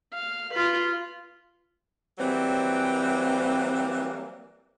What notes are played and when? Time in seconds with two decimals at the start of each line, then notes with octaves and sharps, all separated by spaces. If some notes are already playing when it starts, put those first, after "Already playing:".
0.14 F5
0.54 F4 B4
2.18 E3 F#3 G3 A#3 C4